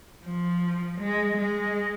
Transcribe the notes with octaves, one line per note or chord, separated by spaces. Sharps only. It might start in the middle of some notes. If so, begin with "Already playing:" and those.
F3
G#3
G#3